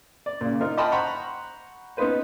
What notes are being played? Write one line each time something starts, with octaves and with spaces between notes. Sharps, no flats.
D5
A#2 C#3
A#3 D#4 F4 A#4
D#5 G5 A5 B5 C6 F6
C5 F#5 A#5 B5 C#6
B3 C#4 D#4 F4 B4 C5